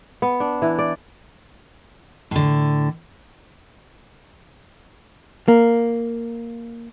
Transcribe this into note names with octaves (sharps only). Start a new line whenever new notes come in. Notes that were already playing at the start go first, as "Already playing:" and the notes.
B3
D4
E3
D5
A2 D3
A#3